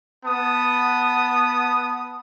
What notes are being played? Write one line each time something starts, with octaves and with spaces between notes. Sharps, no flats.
B3 A5 D#6